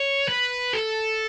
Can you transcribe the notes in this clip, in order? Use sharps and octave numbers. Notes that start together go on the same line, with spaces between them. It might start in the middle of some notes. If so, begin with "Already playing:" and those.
Already playing: C#5
B4
A4